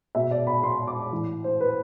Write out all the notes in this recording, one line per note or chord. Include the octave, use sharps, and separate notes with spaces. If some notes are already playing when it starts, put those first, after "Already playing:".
B2 E5
D5
B5
C6
D6
A2 E3
C5
B4